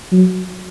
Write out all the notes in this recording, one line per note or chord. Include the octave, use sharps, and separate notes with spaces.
F#3